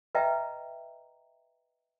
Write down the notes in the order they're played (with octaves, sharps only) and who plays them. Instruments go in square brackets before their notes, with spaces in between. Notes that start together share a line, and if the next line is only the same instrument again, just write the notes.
[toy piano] B4 D#5 E5 G5 A#5